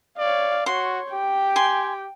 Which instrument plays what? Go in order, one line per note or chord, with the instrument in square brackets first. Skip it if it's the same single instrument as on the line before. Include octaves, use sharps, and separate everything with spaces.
[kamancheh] C#5 F5 [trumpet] D5
[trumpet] F#4 [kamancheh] C#5 [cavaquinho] C6
[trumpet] G4 [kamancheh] G5
[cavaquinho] G#5 C6